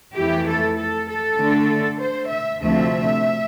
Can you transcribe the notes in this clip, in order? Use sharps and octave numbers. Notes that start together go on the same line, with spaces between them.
F2 E3 A3 E4 G4
A4
A4
A4
D3 A3 D4
C5
E5
D2 C3 F3 A3 E5